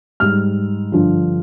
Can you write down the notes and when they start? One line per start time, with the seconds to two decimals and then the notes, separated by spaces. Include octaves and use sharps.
0.20 G#2 G3 F6
0.92 G2 D3 F3